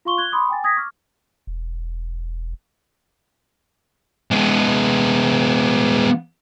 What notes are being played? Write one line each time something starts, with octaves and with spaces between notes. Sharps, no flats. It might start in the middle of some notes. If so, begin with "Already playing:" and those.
F4 F5 C6 C#6 G7
F#6 G#6 G7
B5 C6 D6 D#6
G5 G#5 A6
D#6 G#6 A#6 B6
C#6 D6 F6
E1
G#3 B3